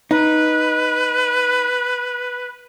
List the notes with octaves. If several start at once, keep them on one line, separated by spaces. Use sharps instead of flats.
D#4 B4